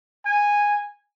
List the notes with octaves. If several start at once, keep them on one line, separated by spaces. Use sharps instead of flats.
G#5